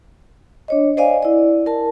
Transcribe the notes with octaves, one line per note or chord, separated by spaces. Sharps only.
D4 C#5 D#5
C5 D5 D#5 F5 G#5
E4 D5
A#4 A5